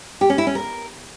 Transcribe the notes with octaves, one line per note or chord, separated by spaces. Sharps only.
G4
C#4
E4
C#4
A#4